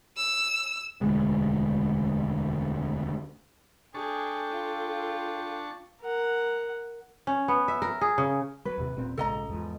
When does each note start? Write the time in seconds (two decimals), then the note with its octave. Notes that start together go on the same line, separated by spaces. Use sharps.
0.17 E6
1.01 E1 D2 G#3
3.94 D4 G#4 A4 G5 A5 C#6
4.50 F4
6.01 A#4 F#5
7.27 C#4
7.48 B3
7.68 E5
7.82 A#4
8.01 G#4
8.18 C#3
8.65 F#3 B4
8.78 D#2 A2 C3
8.97 D#1 A#2 C4
9.17 A#1 G#2 C#3 A4 D#5 A#5
9.49 E2 G#2 F3